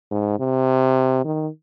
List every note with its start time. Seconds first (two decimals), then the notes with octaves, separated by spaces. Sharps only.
0.11 G#2
0.40 C3
1.24 D#3